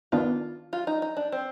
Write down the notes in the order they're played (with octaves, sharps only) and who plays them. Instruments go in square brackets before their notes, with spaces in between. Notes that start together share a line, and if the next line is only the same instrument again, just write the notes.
[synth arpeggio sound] D#3 B3 D4 [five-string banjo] F4
[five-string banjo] F4
D#4
D#4
D4
C4